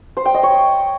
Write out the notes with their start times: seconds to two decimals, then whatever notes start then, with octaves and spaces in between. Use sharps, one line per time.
0.17 C5
0.26 G5
0.34 D#5
0.43 C#5